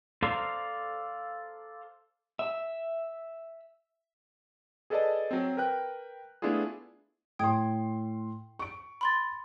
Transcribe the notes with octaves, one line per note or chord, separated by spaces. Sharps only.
A4 C5 D5 F5 A#5
E5
G#4 A4 B4 D5 D#5 A5
F#3 C4
A#4 B4 G5 F#6
A3 B3 D4 E4 F4 G#4
A2 G5 C6 D#6 G#6
C#6 D7
B5 C6 A6